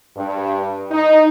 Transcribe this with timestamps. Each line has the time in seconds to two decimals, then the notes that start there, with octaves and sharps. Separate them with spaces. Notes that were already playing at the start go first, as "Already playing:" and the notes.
0.17 G2
0.92 D#4